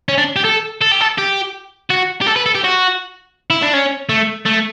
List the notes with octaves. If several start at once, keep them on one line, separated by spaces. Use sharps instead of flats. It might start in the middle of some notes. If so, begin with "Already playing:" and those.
C#4
D4
G4
A4
A4
G4
A4
G4
F#4
G4
A4
B4
A4
G4
F#4
E4
D4
C#4
A3
A3